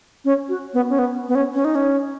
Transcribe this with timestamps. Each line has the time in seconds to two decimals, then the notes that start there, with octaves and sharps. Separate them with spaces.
0.25 C#4
0.49 F#4
0.74 B3
0.90 C#4
0.99 B3
1.28 B3
1.35 C#4
1.54 C#4
1.65 D#4
1.75 C#4